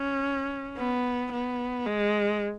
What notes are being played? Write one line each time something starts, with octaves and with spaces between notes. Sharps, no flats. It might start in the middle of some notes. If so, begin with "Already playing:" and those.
Already playing: C#4
B3
B3
G#3